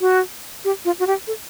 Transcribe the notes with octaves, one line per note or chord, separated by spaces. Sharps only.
F#4
G4
F4
F#4
G4
A4